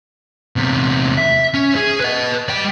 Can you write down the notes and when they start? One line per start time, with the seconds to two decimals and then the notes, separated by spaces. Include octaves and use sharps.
0.56 E2 C3
1.17 E5
1.54 C#4
1.76 G#4
2.01 B4 D#5
2.49 G3 G5